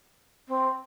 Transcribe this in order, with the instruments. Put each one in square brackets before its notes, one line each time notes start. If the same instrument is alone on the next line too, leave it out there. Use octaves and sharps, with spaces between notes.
[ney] C4